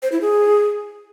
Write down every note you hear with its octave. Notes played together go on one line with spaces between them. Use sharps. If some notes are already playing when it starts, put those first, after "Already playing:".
C5
E4
G#4